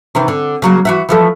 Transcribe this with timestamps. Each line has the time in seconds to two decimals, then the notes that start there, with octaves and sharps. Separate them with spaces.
0.15 C3 D#3 E3
0.28 D3
0.62 C#3 F#3 A#3
0.85 E3 F#4 E5
1.09 E3 F3 A3